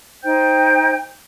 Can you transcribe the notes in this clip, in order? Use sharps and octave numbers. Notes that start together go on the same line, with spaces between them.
D#4 C5 G5 G6